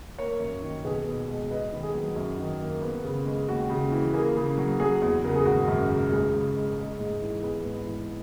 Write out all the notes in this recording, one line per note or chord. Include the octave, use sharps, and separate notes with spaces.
A#3 A#4 C#5
F#2
D#3
B1 G#4 B4
B2
G#3
B3 B4 D#5
D#3
G#4
F#3
F#2
D#3
A#3
B3
C#3
G#3
D#2 F#4
C#3
E3
A#3 G#4
C#3
F#3
F#3 G#4
E2
C#3 A#4
G#4
G#1 F#4
F#2
C#3
C#2 G#4
C#3
G#3
G#3
G#2
E3
B3 G#4 B4
G#2
E3